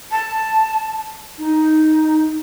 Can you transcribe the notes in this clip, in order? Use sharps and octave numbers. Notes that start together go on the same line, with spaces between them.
A5
D#4